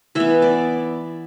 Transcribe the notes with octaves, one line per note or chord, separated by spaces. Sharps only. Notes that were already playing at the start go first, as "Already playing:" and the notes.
E3 B3 E5
D5